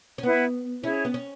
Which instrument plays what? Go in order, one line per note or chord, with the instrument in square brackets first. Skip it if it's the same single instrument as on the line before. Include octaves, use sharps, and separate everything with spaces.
[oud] C#4
[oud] B3 [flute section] E4 B4 F#5
[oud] C#4 [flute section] E4 G#4 C#5
[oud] B3
C#4